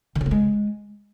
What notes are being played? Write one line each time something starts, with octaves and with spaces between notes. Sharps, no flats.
D#3
C#3
A3
G#3